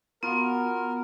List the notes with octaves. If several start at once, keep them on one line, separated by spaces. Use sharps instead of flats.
B3 F4 F#4 A#4